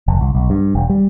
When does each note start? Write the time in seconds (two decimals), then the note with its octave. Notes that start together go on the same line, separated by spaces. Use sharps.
0.08 F1
0.21 C2
0.35 B1
0.50 G2
0.75 E1
0.90 G3